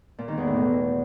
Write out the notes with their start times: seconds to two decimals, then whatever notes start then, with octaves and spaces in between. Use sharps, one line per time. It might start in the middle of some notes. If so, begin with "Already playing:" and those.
0.19 A#2
0.28 D#3
0.38 E2
0.47 A2
0.57 B2